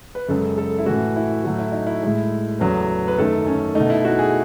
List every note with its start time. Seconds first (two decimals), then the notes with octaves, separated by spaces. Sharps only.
0.15 B4
0.28 F#2 C#3 G#3 A4
0.58 A4
0.78 E4
0.86 A2 E3 A3 F#4
1.16 E4
1.44 A2 F#3 A3 F#4
1.59 E4
1.72 D#4
1.87 E4
2.03 A2 G#3
2.60 E2 C#3 F#3 A3 B4
3.08 B4
3.18 F#2 D#3 A3 A4
3.46 C#4
3.75 B2 A3 D#4
3.90 E4
4.05 F#4
4.19 G#4